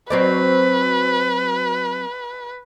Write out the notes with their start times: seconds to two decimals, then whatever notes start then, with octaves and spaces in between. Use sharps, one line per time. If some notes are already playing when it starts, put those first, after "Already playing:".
0.10 F#3 C4 B4 D5